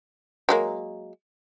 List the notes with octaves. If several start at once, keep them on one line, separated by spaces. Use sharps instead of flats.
F#3 G#3 A#3